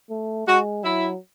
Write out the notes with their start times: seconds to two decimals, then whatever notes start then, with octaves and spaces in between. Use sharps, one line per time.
0.10 A3
0.47 G#3 F#4
0.83 F#3 E4